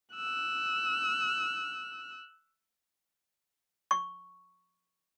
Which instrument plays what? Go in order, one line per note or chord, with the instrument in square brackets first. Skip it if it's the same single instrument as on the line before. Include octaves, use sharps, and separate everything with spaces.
[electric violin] E6 F#6
[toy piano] C#6